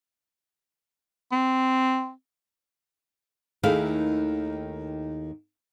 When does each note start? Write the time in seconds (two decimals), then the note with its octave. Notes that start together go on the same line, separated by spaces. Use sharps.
1.32 C4
3.63 D#2 D#3 A3 E4 G#4 F5